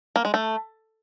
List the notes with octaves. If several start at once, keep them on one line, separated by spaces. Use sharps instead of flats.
A#3
G#3
A3